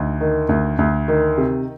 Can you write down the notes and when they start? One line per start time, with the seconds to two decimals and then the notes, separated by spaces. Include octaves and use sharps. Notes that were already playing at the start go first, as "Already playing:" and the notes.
Already playing: D2 D#4
0.21 D#3
0.49 D2
0.79 D2
1.08 D#3
1.38 C3